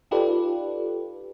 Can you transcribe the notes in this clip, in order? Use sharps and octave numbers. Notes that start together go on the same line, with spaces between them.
D#4 F4 G4 A4 B4 D5